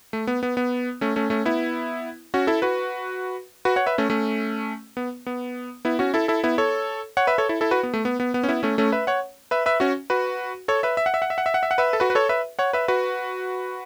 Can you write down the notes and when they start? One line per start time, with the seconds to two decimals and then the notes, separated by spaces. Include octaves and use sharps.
0.13 A3
0.27 B3
0.43 B3
0.57 B3
1.01 A3 C#4
1.16 A3 C#4
1.30 A3 C#4
1.45 B3 E4
2.34 C#4 F#4
2.47 E4 A4
2.62 F#4 B4
3.65 F#4 B4
3.76 C#5 F#5
3.86 B4 E5
3.98 A3 C#4
4.10 A3 C#4
4.97 B3
5.27 B3
5.85 B3 E4
5.99 C#4 F#4
6.14 E4 A4
6.28 E4 A4
6.43 B3 E4
6.58 A4 C#5
7.17 C#5 F#5
7.27 B4 E5
7.38 A4 C#5
7.49 E4 A4
7.61 E4 A4
7.71 F#4 B4
7.83 B3
7.94 A3
8.05 B3
8.20 B3
8.34 B3
8.43 C#4
8.48 B3 E4
8.63 A3 C#4
8.78 A3 C#4
8.92 B4 E5
9.07 C#5 F#5
9.51 B4 E5
9.66 B4 E5
9.80 C#4 F#4
10.10 F#4 B4
10.68 A4 C#5
10.83 B4 E5
10.97 E5
11.06 F#5
11.14 E5
11.22 F#5
11.30 E5
11.38 F#5
11.46 E5
11.54 F#5
11.63 E5
11.71 F#5
11.78 B4 E5
11.93 A4
12.00 F#4 B4
12.10 B4
12.15 A4 C#5
12.29 B4 E5
12.59 C#5 F#5
12.73 B4 E5
12.88 F#4 B4